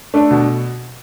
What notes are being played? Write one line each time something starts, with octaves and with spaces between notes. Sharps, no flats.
A3 D4
B2